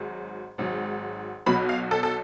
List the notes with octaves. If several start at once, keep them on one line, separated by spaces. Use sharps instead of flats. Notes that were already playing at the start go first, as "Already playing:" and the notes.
Already playing: G#1 G#2 F#3
G#1 G#2 F#3
B1 B2 F#3 B5
F5
A4
A4